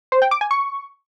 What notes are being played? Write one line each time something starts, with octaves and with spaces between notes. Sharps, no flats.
C5
G5
D6
G#5
C#6